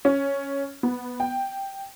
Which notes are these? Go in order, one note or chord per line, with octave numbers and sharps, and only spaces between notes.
C#4
B3
G5